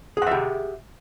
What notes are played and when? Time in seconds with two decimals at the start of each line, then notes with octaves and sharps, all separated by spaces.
0.17 G#4
0.22 F#5
0.27 E5
0.31 G4